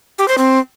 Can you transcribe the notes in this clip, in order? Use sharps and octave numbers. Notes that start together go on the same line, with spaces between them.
G4
C5
C4